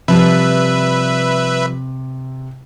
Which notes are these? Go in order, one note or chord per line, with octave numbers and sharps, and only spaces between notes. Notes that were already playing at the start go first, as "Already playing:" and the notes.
C3 F3 G3 B4 E5